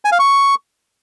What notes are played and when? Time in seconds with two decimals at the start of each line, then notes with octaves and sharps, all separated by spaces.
0.05 G#5
0.12 F5
0.19 C#6